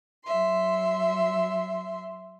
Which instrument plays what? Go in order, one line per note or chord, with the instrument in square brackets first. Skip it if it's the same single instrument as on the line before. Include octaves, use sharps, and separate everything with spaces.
[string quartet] F#3 E5 C6